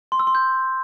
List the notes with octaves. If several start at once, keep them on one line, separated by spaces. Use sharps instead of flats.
C6
E6
C6
G6